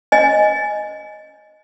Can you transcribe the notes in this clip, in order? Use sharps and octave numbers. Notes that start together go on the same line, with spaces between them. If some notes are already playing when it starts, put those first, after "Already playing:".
D#5 G#5